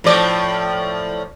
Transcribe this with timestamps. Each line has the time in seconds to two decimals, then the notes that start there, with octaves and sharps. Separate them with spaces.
0.04 A2 F3 D5